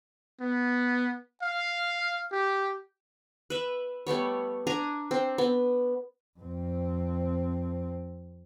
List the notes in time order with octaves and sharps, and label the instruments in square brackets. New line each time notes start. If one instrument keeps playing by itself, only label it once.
[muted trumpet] B3
F5
G4
[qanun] B4 E5
G3 A3 B3 C#5
D4 G#5 A#5
C4
B3
[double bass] F2 C4